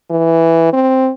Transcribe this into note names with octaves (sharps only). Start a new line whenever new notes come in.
E3
C4